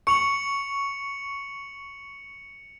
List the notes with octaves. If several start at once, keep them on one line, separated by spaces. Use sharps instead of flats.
C#6 C#7 F7 F#7